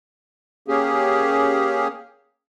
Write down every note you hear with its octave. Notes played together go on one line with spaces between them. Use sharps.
A#3 C#4 G4 G#4